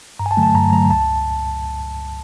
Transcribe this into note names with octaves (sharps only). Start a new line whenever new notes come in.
G2 A#5
G#5
A5
D3 F#3 A3
A5
G2 A#5
D3 F#3 A3 A#5
C#2 A5